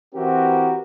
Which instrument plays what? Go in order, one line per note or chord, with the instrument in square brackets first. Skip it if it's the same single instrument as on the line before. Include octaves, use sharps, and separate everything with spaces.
[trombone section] E3 C4 E4 F#4 G4 A#4